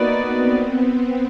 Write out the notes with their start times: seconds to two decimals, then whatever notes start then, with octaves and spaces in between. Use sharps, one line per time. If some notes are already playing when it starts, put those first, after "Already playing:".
Already playing: A#3 B3 D#4 F#4 B4 D5
0.23 C4